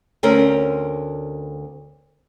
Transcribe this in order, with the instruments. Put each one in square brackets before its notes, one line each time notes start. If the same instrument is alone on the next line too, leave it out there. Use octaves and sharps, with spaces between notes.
[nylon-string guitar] D2 C4 C#4 A#4